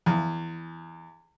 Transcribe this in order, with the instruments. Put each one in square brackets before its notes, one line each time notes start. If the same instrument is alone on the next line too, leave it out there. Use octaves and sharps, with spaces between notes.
[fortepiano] E2